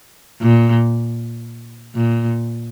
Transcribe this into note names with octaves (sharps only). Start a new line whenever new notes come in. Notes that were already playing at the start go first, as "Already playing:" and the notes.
A#2
A#2